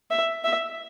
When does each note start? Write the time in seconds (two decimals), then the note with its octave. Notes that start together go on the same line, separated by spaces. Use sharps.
0.11 E5
0.44 E5